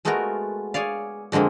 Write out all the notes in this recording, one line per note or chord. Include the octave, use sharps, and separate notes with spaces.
G#3 A3 B3 F4 F#4 A#4
G#4 C#5 D5 F5
F2 D3 G#3 A#3 C4